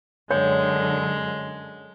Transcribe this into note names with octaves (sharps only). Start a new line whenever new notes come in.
F#2 D3 G#3 C#5 G5